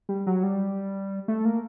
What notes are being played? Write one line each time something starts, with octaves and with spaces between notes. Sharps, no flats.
G3
F#3
G3
A3
A#3